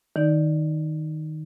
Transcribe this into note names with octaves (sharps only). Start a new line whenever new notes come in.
D#3 D#4 D5